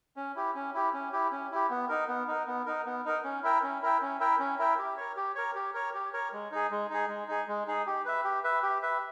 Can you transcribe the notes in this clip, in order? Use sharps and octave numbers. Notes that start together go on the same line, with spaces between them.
C#4
E4 G4
C#4
E4 G4
C#4
E4 G4
C#4
E4 G4
B3
D#4 A#4
B3
D#4 A#4
B3
D#4 A#4
B3
D#4 A#4
C#4
E4 A#4 E5 G5
C#4
E4 A#4 E5 G5
C#4
E4 A#4 E5 G5
C#4
E4 A#4 E5 G5
G4
A#4 C#5
G4
A#4 C#5
G4
A#4 C#5
G4
A#4 C#5
G#3
D#4 G#4
G#3
D#4 G#4
G#3
D#4 G#4
G#3
D#4 G#4
G4
B4 E5
G4
B4 E5
G4
B4 E5